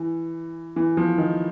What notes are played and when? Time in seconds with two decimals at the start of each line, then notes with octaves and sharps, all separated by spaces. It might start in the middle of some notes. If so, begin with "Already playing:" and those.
Already playing: E3
0.76 E3
0.97 F3
1.18 D#3